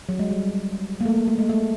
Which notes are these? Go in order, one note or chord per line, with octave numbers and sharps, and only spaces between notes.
F#3
G#3
G3
A#3
A3
A#3
A3
G#3
A3